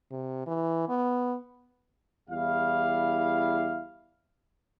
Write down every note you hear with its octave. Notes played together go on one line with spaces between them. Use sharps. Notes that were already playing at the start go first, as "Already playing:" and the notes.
C3
E3
B3
E2 G3 E4 F5